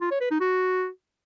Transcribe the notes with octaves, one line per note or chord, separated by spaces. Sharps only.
F4
C#5
B4
D#4
F#4